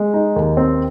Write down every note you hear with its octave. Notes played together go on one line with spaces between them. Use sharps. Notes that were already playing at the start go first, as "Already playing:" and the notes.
Already playing: G#3
D#4
D#2
C4